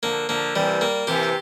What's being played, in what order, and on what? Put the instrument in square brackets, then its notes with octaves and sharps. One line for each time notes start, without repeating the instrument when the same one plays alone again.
[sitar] D3 F3 [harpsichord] A#3
[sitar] D3 F3 [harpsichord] A#3
[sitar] C3 E3 [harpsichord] G3
[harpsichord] A#3
[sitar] C3 E3 [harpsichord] G4